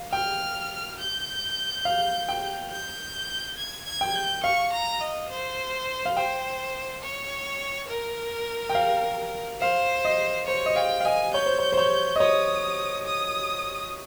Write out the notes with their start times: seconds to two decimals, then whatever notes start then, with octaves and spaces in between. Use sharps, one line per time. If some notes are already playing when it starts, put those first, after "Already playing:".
Already playing: F5
0.13 G5 F6
0.99 G6
1.85 F5
2.29 G5
2.71 G6
3.57 G#6
3.86 G#6
4.01 G5
4.15 G6
4.44 F5 C#6
4.73 A#5
5.01 D#5
5.30 C5
6.05 F5
6.16 C5 G5
7.03 C#5
7.89 A#4
8.69 G5
8.75 F5
9.61 C5 F5
10.05 D#5
10.47 C5 C#5
10.66 D#5
10.76 F5 G5
11.00 F5
11.05 D#5 G#5
11.34 C#5 G6
11.46 C5
11.59 C#5
11.73 C5
11.78 C#5
12.16 D#5
12.20 C#5 D#6
13.06 D#6